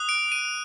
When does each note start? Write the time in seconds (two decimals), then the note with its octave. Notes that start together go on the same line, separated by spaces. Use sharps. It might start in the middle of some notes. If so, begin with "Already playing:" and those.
Already playing: D#6 F#6
0.09 D7
0.32 D#7